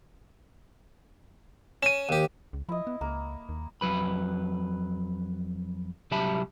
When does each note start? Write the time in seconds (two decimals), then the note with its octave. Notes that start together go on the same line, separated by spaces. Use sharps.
1.83 C#4 D#7 E7
2.09 D#2 G4
2.53 C#2
2.69 F3 E4 D#5
2.87 B3
3.01 C#2 A#3
3.49 D#2
3.81 F2 F#3 B4 B5
6.11 C2 F#3 G4 E5 A5 B5